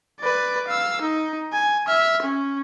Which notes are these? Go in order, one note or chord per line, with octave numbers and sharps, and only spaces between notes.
B4 D5
F5 E6
D#4
G#5
E5 F6
C#4